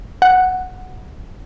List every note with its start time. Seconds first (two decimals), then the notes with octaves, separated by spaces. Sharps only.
0.22 F#5